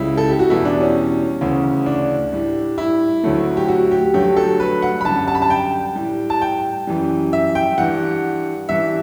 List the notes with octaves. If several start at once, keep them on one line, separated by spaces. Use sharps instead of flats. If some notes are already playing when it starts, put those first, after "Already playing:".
Already playing: C#2 C#3 G3 E4
A4
G4
F#4
E2 B2 G3 E4
D4
C#4
D2 C#3 E3
D4
A2 G3
E4
D2 D3 F#3 A3
G4
F#4
G4
G2 D3 F#3 A3 G4
A4
B4
F#5
B5
F#2 D3 G3 A5
A5
B5
A5
G5
A2 G3
A5
G5
F#2 E3 G3
E5
G5
G2 E3 G3 F#5
G2 E3 G3 E5